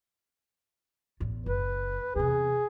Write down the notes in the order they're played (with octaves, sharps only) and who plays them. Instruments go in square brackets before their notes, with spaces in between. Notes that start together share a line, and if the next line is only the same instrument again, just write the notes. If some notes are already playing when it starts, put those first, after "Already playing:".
[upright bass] A1 E2
[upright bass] F#1 [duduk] B4
[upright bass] E2 C3 [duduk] G#4